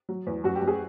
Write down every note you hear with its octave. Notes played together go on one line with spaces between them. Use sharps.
F#3
E2
F#2 F#4
G4
F#2
G#4